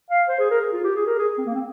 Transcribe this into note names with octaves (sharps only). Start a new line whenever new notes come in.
F5
C5
G#4
A#4
G#4
F4
G4
G#4
A#4
G#4
C4
A#3
C4